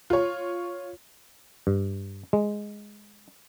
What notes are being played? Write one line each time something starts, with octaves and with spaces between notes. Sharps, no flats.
F4 C#5
G2
G#3